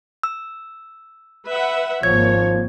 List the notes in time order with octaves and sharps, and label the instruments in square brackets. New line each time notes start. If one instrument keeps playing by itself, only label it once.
[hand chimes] E6
[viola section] B4 E5 F#5
[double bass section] G#1 A#3 [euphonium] F3 [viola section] C#5 [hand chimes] G#6